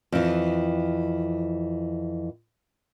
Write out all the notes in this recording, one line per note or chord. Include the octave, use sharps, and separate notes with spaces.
F2 E3